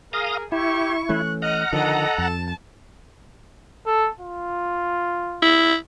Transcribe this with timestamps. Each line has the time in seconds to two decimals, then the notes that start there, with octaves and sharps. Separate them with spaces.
0.13 G#4 A#4 F5 A#5 D#6
0.52 E4 G4 C#6
1.09 E3 A3 C#4 F#6
1.42 D#5 F#5 A#5 F6
1.73 D3 D#3 F3 A4 D#5
2.18 F2 A5
3.86 A4
4.20 F4
5.42 E4